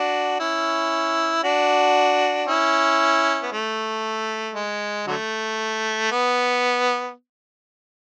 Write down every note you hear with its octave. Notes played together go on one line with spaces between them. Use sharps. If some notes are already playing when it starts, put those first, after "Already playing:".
Already playing: D4 F#4
C#4 E4
D4 F#4
C#4 E4
B3
A3
G#3
D3 F#3 A3
B3